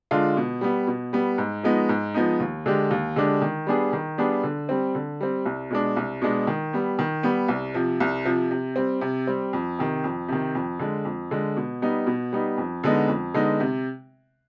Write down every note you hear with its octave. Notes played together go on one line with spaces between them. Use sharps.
D3 G#3 D4 F4
B2
G3 B3
B2
G3 B3
G#2
F3 G#3 B3 D#4
G#2
F3 G#3 B3 D#4
D#2
D3 G#3 D4 G4
D#2
D3 G#3 D4 G4
D#3
G3 B3 D4 G#4
D#3
G3 B3 D4 G#4
D3
G3 C4
D3
G3 C4
C2
B2 G#3 D4
C2
B2 G#3 D4
D#3
G3 B3
D#3
G3 B3
C2
C3 F3
C2
C3 F3
C3
G3 C4
C3
G3 C4
F2
C3 D#3
F2
C3 D#3
F2
D3 G#3
F2
D3 G#3
B2
G3 B3 D#4
B2
G3 B3 D#4
F2
D3 G#3 B3 D#4
F2
D3 G#3 B3 D#4
C3